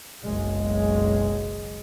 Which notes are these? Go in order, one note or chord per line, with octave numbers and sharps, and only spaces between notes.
F#1 B1 G#3